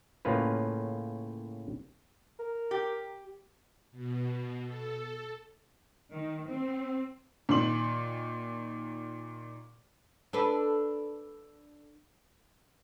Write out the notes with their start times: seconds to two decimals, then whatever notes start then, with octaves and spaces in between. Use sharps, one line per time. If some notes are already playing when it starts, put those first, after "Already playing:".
0.25 A2 C#3 A#3 C#4 F4 B4
2.39 A#4
2.71 G4
3.92 B2
4.64 A4
6.12 D#3
6.46 C4
7.49 A#2 D#3 C6 F#7
10.33 D4 A4 B4